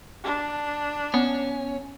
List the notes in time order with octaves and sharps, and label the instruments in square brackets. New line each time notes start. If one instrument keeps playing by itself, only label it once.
[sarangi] D4
[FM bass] B3 [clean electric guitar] C#4